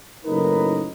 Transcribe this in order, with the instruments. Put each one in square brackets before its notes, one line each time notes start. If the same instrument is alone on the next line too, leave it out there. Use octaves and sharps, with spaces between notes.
[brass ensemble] F#1 A2 D#4 A#4 B4 D#5